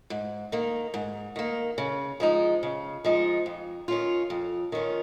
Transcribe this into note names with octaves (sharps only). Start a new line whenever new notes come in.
G#2
D#3 A#3
G#2
D#3 A#3
C#3
F3 G#3 D#4
C#3
F3 G#3 D#4
F2
D#3 C#4 F4
F2
D#3 C#4 F4